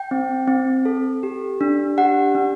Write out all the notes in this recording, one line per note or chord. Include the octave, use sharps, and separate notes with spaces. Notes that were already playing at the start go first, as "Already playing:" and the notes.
Already playing: G5
C4
C4
A4
G4
D4
G4 F#5
D4